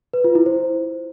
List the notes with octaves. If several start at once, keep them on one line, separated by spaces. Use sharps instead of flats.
B4
F4
E4
C5